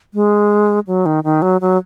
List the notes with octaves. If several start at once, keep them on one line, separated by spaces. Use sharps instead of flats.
G#3
F#3
D#3
D#3
F#3
F#3